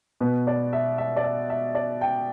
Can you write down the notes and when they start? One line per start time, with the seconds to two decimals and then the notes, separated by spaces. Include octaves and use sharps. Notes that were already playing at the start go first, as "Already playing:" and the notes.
0.21 B2 B3 B4
0.47 D5
0.73 E5
0.98 E5
1.16 D5
1.24 E5
1.50 E5
1.75 D5
2.01 G5